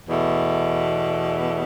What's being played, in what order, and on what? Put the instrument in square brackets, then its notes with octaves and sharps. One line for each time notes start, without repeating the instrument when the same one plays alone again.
[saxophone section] E2 B2 A3